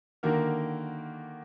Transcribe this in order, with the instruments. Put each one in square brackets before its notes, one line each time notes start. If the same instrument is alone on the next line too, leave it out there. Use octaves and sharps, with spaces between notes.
[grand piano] D3 D#3 A#3 F#4 A#4